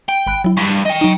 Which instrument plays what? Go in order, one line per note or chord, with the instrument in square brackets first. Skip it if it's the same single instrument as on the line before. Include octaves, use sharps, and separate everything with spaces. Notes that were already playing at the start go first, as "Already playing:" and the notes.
[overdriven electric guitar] G5
[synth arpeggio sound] G#1 B5 F#6
F#3 E4
[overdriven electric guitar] G2 [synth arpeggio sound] C#6
[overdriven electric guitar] D#5 G5
[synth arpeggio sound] F#3 D#4